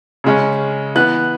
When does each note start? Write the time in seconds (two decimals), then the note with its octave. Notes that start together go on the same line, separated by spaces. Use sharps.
0.24 C#3 G#3 C#4
0.95 E3 B3 F#6